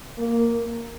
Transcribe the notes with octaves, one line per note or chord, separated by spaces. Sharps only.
A#3